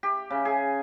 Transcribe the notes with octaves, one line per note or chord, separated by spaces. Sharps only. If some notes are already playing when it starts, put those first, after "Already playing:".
G4
C#3
G#4